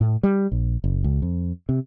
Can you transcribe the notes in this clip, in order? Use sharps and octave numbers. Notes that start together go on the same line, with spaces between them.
A2
G3
A#1
F#1
C#2
F2
C3